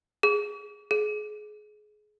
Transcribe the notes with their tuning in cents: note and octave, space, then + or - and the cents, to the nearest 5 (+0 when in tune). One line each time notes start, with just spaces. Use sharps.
G#4 +0
G#4 +25